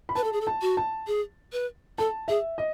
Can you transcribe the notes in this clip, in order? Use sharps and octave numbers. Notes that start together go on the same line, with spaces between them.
B5
B4 A5
A4
G#4
A4
A5
F#4
A5
G#4
B4
A4 A5
G#4 E5
D#5